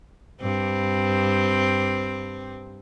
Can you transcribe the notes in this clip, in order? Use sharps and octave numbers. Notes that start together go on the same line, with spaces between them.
G2 C4